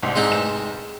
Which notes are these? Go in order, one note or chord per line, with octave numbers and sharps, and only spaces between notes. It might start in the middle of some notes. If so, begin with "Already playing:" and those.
C2 G#2
G#3 C4 D#4
F1 E7